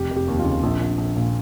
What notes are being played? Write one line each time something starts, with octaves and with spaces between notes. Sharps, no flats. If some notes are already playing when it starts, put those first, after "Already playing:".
Already playing: F1 G4
F1
G4
D#2
F4
C#3
A#1
A#1
A#1
A#2